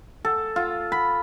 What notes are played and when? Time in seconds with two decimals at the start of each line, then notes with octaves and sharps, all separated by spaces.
0.25 A4
0.56 F4
0.92 B5